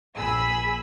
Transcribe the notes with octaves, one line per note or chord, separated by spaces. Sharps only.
A#1 G#4 G#5 B5 E6